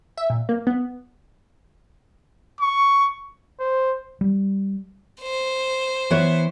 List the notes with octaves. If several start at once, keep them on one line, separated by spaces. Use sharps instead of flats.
E5
A#2
A#3
B3
C#6
C5
G3
C5
E3 B3 C#5